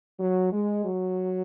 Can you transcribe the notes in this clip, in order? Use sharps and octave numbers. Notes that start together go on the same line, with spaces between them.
F#3
G#3
F#3